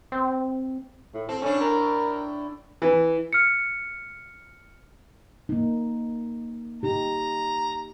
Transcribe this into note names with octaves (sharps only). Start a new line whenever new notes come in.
C4
A2
C4 A4
A2 C#4 D4
A#4
E3
F6 C#7
A#3 D#4
D#4 G4 A#5